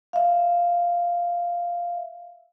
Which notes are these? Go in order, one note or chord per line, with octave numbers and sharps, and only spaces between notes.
E5 F5